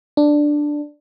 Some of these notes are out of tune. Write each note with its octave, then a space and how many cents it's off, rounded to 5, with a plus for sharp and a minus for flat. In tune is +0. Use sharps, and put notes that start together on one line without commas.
D4 +5